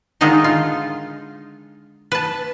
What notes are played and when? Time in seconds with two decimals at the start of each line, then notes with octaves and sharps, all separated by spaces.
0.21 D3 D#3 G#3 D#4 F4 A4
0.44 F4
2.12 B4 A5